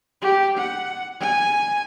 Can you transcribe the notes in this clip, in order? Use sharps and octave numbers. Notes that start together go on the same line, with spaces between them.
G4
F#5
G#5